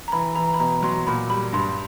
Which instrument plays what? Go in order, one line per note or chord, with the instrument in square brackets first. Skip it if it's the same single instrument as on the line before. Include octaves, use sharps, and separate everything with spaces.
[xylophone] A#5
[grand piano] E3 [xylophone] B5
[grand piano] E3 [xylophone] A#5
[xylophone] B5
[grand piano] B2 [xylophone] A#5
[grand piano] F#3 [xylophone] C6
[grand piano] A#2 [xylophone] B5
[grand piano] G3 [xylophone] B5
[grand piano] G2 [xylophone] C6